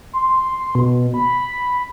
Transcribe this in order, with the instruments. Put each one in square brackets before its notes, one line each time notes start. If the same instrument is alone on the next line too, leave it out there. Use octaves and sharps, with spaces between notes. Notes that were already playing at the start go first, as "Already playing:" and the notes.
[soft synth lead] C6
C6
B2
B5